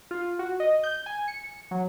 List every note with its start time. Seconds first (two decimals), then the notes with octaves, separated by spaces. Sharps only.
0.11 F4
0.39 F#4
0.60 D#5
0.84 G6
1.06 G#5
1.28 C#7
1.71 F#3